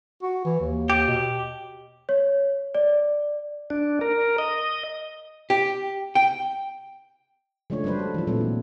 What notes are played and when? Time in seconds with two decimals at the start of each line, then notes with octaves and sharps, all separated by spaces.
0.22 F#4
0.45 E3
0.60 D#2
0.90 G4
1.08 B2
2.09 C#5
2.75 D5
3.70 D4
4.01 A#4
4.38 D#5
5.50 G4
6.15 G5
7.70 C#3 F3 G#3 A3 D4 C#5
7.84 F#3 G3 D4 B4 C5
7.99 A4
8.14 E3 F3
8.27 A#2 F#3 A3 C4 D4
8.41 E3